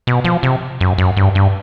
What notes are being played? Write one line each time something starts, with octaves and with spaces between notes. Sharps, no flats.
B2
F3
C3
F#2
F#2
G2
G2